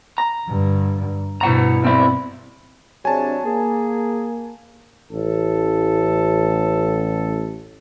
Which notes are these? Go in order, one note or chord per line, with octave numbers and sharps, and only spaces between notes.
A#5
G2 D3
G2 B2 E4 F#5 A#5
B1 C4 E4
C3 F#3 D4 G#4 G#5 A5
A#3 G#4
A1 A4